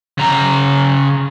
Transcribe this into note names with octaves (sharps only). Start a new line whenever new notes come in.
C#3 A#5